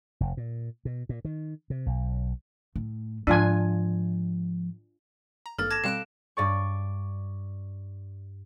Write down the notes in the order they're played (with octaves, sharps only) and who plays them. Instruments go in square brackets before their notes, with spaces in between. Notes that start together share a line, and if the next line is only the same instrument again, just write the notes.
[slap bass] F1
A#2
B2
A#2
D#3
C3
B1
[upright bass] A2
[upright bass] G#2 F3 [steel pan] D4 F4 G#5
[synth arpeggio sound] A#5
[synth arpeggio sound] G#1 G2 A#3 [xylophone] A4 A6 [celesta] F6
[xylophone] A5 D6 A#6 [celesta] G#6 E7
[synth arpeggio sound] B2 G3 C4 [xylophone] F5 F#6 D7 [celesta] E7
[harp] G2 D5 C#6